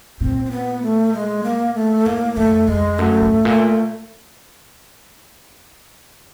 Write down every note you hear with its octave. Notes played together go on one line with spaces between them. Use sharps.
A#2 C4
C4
B3
A3
G#3
A#3
A3
A2 A#3
F2 A3
F2 G#3
F#2 A3
G#2
A#2